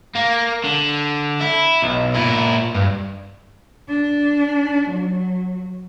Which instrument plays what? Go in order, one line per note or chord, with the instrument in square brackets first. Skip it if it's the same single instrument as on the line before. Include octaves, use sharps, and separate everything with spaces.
[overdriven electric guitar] A#3
D3
E4
B1
A#2 E4
G2
[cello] D4
F#3